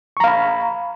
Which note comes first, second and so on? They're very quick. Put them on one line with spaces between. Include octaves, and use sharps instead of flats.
C#6 A#5 F5 B5